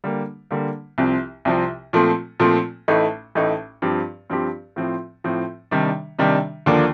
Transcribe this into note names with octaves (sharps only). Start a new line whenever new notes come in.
D3 G3 A#3
D3 G3 A#3
C2 C3 F3 C4
C2 C3 F3 C4
A#2 F3 A3 C4
A#2 F3 A3 C4
A1 A2 A3 D#4
A1 A2 A3 D#4
G2 F3 C4 G4
G2 F3 C4 G4
A2 F3 C4
A2 F3 C4
C3 D#3 G3 D4
C3 D#3 G3 D4
D#2 D3 F3 A#3 D4